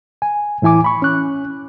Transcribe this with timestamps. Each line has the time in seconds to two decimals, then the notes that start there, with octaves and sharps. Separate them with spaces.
0.22 G#5
0.62 A2 E3 E4 G#5 D6
0.84 B5 C#6
1.02 C#4 F#6